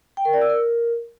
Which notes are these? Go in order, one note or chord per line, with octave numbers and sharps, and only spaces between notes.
G5
A#4
D5
E6
A#4